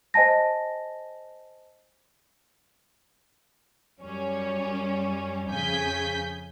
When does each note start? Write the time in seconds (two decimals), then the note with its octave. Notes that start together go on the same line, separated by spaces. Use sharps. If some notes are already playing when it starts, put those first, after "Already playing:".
0.14 C5 D#5 G#5 A5 A#6
4.01 F#2 G3 C#4
5.50 F2 C#3 G#5 G6 B6